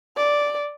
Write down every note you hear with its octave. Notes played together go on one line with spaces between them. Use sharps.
D5